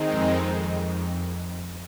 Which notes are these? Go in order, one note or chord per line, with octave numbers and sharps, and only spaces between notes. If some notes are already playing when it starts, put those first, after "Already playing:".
Already playing: D#3 G#3 C4 D#4
F2